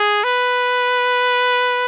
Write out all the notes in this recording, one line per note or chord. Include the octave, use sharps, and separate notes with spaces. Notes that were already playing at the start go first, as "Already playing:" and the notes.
Already playing: G#4
B4